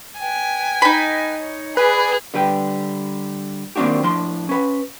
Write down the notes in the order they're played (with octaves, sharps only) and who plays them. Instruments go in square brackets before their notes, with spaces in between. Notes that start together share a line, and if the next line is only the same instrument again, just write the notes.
[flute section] B4 G5 [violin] G#5
[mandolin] D#4 B5
[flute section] C#5
[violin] G#4 [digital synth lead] B4 [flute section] D5 G#5 B5
[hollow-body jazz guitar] D3 G3 B4 G5
D#3 A#3 C4 D4 F#4 G4
A2 F3 D4 C6
C#4 B4